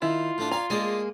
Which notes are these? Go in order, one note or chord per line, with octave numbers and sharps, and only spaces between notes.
D#3 E4 F4
A2 A3 D4
D5 F5 G#5 A#5
G#3 A#3 D4 G#4 D5 D#5